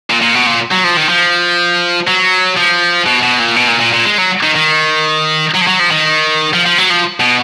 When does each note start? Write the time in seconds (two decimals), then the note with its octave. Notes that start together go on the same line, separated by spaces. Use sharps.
0.10 A#2
0.21 A#2
0.35 B2
0.47 A#2
0.71 F#3
0.84 F3
0.97 D#3
1.09 F3
2.08 F#3
2.57 F3
3.06 B2
3.23 B2
3.39 A#2
3.56 B2
3.68 A#2
3.80 A#2
3.93 A#2
4.06 G#3
4.18 F#3
4.43 D#3
4.55 D#3
5.54 F#3
5.61 F3
5.67 F#3
5.79 F3
5.91 D#3
6.54 F3
6.66 F3
6.78 F#3
6.90 F3
7.20 B2